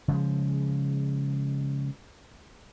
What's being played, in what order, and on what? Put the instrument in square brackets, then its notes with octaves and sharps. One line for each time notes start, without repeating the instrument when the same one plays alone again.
[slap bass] C#3 F3 G#3